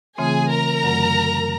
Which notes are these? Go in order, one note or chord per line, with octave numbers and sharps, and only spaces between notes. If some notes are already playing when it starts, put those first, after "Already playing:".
C#3 E3 A3 C4 F4 G#4 G#5
A#4 A#5
F#2 D3 F#3 A3